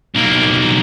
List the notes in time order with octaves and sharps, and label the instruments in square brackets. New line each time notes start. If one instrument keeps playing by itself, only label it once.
[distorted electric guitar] B1 A#3